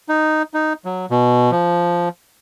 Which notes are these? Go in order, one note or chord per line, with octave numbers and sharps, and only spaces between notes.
D#4
D#4
F#3
B2
F3